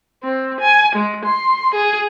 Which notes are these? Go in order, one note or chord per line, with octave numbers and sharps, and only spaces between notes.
C4
G#5
G#3
C6
G#4